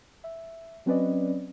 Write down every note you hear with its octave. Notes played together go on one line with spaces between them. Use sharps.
E5
F#3 C4 C#4 B4 D5 D#5